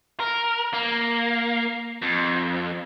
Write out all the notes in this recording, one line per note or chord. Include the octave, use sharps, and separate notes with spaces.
A#4
A#3
F2